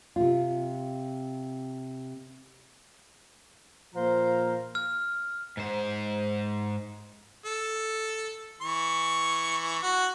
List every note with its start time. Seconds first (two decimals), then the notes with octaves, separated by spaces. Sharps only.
0.16 C3 F4
3.95 A#2 F3 C5 F5 A#5
4.75 F6
5.57 G#2 C5
7.45 A4
8.62 E3 C#6
9.83 F#4